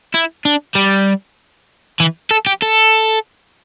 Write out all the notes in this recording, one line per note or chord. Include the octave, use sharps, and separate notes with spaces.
E4
D4
G3
E3
A4
G4
A4